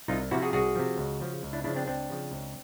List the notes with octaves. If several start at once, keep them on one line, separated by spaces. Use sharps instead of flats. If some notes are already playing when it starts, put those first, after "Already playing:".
C2 D#4 F4
C3 F3 E4 F#4
F#4 G#4
C2 F#4 G#4
C3 F3
C#2
C#3 F3
C#2
D4 E4
C#3 F3 D4 E4
C4 D4
C#2 C4 D4
C#3 F3
C#2